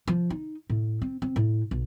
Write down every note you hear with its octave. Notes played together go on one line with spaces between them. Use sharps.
F3
D#4
A2
C4
C4
A2
B1